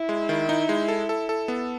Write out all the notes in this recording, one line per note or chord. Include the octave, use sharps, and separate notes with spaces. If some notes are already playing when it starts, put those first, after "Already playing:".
Already playing: E4
G#3
D#3
D#4
G#3
A4
A4
A4
B3